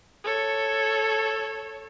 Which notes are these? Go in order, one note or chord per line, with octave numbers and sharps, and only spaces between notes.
A4 C#5